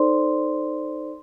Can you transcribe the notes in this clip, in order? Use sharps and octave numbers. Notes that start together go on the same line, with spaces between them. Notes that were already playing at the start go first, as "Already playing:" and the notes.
Already playing: D#4 A4 C5 D5 C6